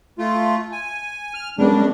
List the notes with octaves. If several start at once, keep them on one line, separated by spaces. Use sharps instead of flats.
A3 F4
G#5
F6
F#2 G3 G#3 B3 D4